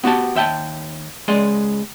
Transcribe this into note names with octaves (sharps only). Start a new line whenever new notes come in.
B3 F#4 G4 A5
D#2 E5 G5 A5
C#2 G#3 D5 D#5